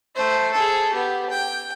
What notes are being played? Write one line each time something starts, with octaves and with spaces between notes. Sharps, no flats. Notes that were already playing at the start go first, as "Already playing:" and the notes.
A3 C5
G#4 A4
B3 G4
G5